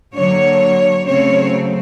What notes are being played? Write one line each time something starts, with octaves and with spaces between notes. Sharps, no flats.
D3 F#3 A#3 C#5
C#3 F#3 A3 C4 C#5